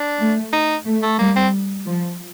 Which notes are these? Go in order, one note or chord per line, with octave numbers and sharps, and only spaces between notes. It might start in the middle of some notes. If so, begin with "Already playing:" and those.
Already playing: D4
A3
D#4
A3
A3
G3 A#3
C4
F3